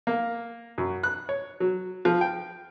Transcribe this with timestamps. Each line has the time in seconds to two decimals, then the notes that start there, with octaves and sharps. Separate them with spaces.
0.07 A#3
0.78 F#2
1.03 F#6
1.29 C#5
1.60 F#3
2.05 F3
2.21 G5